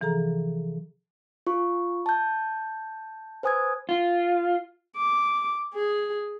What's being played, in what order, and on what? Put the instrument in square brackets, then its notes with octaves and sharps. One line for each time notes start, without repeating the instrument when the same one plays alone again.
[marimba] C3 E3 F3 G#4 A4 A#5
[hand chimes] F4 C#6
A5 G6
B4 C5 G#5 D#6 E6 G#6
[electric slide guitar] F4
[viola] D6
G#4